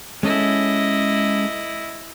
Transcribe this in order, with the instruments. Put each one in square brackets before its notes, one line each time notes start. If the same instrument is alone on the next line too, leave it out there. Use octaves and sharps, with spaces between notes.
[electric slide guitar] G#3 C#4 A4 [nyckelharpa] E4 D#5